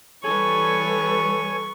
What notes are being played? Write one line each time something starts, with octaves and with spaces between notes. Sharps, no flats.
E3 G3 A4 B4 C#5 G#5 C#6